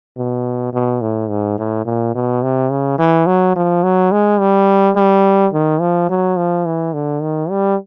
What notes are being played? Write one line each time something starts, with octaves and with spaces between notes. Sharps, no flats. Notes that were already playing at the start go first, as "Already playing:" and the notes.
B2
B2
A2
G#2
A2
A#2
B2
C3
C#3
E3
F#3
F3
F#3
G#3
G3
G3
D#3
F3
F#3
F3
E3
D3
D#3
G3